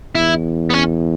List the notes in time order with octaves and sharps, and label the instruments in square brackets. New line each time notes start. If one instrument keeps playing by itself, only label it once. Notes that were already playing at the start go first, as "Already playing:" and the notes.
[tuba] E2 [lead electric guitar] E4
[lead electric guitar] B3
C#4